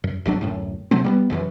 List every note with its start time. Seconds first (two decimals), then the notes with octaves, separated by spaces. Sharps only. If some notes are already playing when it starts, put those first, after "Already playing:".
0.04 F#2
0.25 D1 G#1 F#3 D4
0.41 D1 F#2 A2
0.91 C3 F#3 A3 C4
1.04 G3 A#3 B3
1.30 F1 F#2 A#2 E3